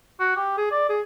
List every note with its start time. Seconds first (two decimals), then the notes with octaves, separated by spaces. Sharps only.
0.20 F#4
0.36 G4
0.57 G#4
0.71 D5
0.89 G#4